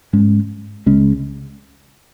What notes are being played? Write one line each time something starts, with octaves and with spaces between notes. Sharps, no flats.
G#2 G#3 C#4
C#2 C#3 G#3 C#4